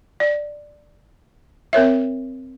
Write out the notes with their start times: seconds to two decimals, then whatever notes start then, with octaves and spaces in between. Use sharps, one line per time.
0.20 D5
1.73 C4 A#4 C#5 E5